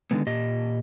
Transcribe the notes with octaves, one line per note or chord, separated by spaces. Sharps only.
D3 D#3 G#3 B3
A#2 G4 D#5